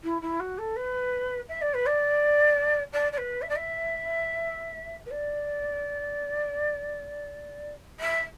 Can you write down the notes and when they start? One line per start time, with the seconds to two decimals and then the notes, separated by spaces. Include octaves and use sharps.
0.04 E4
0.22 E4
0.40 F#4
0.58 A4
0.76 B4
1.49 E5
1.61 D5
1.74 B4
1.86 D5
2.93 D5
3.12 D5
3.18 B4
3.42 E5
3.49 D5
3.56 E5
5.06 B4
5.11 D5
8.00 E5